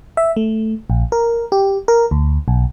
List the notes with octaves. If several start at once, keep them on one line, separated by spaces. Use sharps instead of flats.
E5
A3
A#1
A#4
G4
A#4
D2
B1